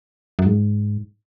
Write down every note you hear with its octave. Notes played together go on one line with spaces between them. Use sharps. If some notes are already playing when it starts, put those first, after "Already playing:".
F#2
G#2